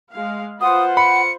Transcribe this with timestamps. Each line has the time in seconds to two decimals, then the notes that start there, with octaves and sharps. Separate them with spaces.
0.12 G#3 F5
0.61 F4 B4 C5 F#5 D#6
0.97 B5 C#7